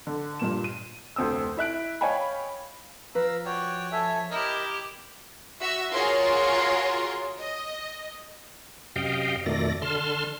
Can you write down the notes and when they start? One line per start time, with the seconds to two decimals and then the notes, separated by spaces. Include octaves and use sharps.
0.07 D3
0.39 G2 A#2 E7
0.64 D#7
1.16 F1 D2 C4 D#6 E6
1.57 E4 E5 F#6 D7
2.01 C#5 D#5 F5 G5 G#5 B5
3.15 F3 B4 F5 A#5 E6
3.45 F#4 C#5 D5 G5
3.92 A4 E5 G#5
4.31 E4 G4 A#4 D#5
5.60 F#4 E5 E6
5.94 F4 F#4 G#4 A#4 C#5 C6
7.38 D#5
8.96 F#2 C3 D#5 F5 G5
9.46 F2 B2 D#3 A3 D5 A#6
9.82 D3 A5 C6 F6